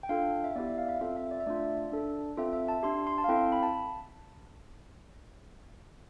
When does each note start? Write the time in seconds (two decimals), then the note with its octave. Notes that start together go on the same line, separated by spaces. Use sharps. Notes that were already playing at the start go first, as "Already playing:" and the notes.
0.03 G5
0.09 D4 F4 A4 F5
0.44 E5
0.56 B3 E4 G4 D5
0.67 E5
0.78 F5
0.89 E5
1.00 C4 F4 A4 E5
1.16 E5
1.27 E5
1.31 D5
1.40 E5
1.46 A3 D4 F4 D5
1.92 D4 A4
2.37 C4 F4 A4 E5
2.53 E5
2.68 A5
2.83 D4 G4 C6
3.07 C6
3.18 A5
3.24 F5
3.28 C4 E4 A4 G5
3.52 B5
3.62 A5